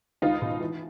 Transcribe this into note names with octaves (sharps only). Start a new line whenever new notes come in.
C#2 D#4 F4
B2
E3